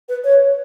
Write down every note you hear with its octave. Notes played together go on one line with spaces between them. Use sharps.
B4
C#5